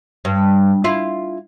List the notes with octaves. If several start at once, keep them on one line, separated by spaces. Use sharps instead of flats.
G2
E4 F4